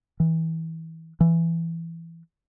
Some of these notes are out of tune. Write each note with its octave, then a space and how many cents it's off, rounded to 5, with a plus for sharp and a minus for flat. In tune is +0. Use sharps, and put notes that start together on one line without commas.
E3 -25
E3 +15